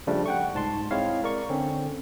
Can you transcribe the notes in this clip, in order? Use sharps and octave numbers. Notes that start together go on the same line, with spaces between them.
C#3 F3 G3 A3 D4
F#5 G5 C#6
C2 G#2 A5 C6
G#3 C4 E4 C#5 F5
A#4 D5 C#6
D3 C4 C#4